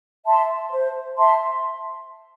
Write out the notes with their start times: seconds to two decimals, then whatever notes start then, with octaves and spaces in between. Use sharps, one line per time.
0.26 E5 A5 C6
0.72 C5
1.18 E5 A5 C6